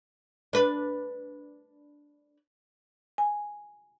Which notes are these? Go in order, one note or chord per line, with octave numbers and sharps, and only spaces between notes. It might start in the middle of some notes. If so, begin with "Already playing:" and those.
D4 B4
G#5